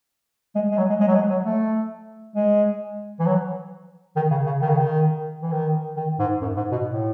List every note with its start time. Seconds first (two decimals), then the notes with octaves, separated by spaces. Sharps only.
0.55 G#3
0.72 G#3
0.78 F#3
0.90 G#3
1.00 G#3
1.08 F#3
1.15 G#3
1.30 F#3
1.46 A3
2.36 G#3
3.20 E3
3.26 F#3
4.16 D#3
4.31 C#3
4.46 C#3
4.62 D#3
4.69 C#3
4.77 D#3
5.42 E3
5.52 D#3
5.97 D#3
6.19 G#2
6.42 F#2
6.57 G#2
6.72 B2
6.87 A2